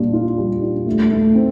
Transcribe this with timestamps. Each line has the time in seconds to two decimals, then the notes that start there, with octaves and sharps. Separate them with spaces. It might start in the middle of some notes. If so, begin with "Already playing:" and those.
Already playing: A#2 G3 D4 F4
0.13 F4
0.38 G3
0.62 D4
0.86 A3
1.11 A3
1.35 C4